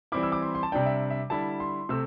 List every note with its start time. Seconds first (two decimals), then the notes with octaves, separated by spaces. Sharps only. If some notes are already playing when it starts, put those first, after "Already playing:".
0.12 E3 G3 C4 E4 D6
0.23 E6
0.32 D6
0.42 C6
0.55 C6
0.63 A5
0.72 C3 G3 D4 G5
0.86 E5
1.10 E5
1.30 D3 G3 E4 A5
1.60 C6
1.89 C3 A3 C4 E6